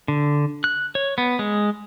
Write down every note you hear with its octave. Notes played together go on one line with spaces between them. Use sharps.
D3
F#6
C#5
B3
G#3